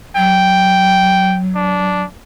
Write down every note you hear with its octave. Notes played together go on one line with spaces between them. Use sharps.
F#3 G5
D4